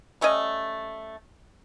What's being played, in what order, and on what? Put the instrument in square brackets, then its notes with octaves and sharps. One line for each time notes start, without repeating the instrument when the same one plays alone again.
[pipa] G3 A3 C#4 D#5